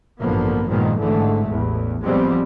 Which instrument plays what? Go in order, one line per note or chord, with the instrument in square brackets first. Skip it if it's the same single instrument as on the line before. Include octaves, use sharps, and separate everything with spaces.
[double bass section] A1 G2 D3 F3 A#3 B3
G2 A#2 D#3 F3 G#3 B3
G#1 G#2 D3 E3 G#3 A3
A1 E2 A2
F3 G3 G#3 B3 C4